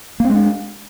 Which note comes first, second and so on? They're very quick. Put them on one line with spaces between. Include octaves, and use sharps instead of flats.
A#3 C4 G#3 D4